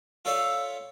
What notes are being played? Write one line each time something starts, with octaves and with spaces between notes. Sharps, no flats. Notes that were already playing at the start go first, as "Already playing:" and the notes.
F4 A4 C#5 D5 E5 F5